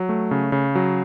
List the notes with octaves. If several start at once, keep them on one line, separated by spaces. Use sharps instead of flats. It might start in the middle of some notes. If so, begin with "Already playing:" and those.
Already playing: F#3
A3
C#3
C#3
F#3